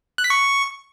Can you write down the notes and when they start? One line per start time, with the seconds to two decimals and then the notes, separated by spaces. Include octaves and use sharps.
0.18 F#6
0.24 B6
0.30 C#6